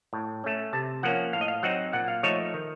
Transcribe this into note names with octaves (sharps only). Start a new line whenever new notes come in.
A2
A3 C#4
C3 A5
F3 A#3 C#4 F#5
A2 F5
D#5
F5
F#3 C4 D#4 F#5
A#2 F#5
F5
F3 A3 D#4 C#5
D#3